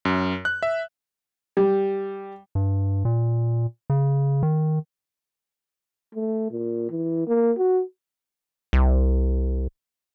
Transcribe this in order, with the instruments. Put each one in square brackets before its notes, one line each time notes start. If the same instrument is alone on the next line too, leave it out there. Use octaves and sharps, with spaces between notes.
[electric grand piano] F#2
F#6
E5
[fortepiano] G3
[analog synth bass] G2
A#2
C#3
D#3
[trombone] A3
A#2
E3
A#3
F#4
[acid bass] C2